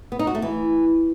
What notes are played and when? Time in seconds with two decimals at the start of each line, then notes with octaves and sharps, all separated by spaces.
0.12 B3
0.19 D#4
0.27 F#4
0.35 A3
0.42 E3